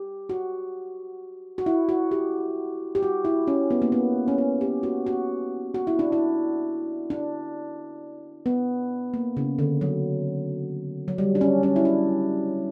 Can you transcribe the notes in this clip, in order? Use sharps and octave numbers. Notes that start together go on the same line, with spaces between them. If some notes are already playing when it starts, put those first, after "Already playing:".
Already playing: G4
F#4
F#4
E4
F#4
G4
G4
F#4
E4
C#4
B3
A#3
B3
C#4
B3
G4
F#4
F#4
F#4
E4
D4
E4
D4
B3
A#3
C#3
D3
F#3
F#3
G3
D4
C#4
C#4
E4
D4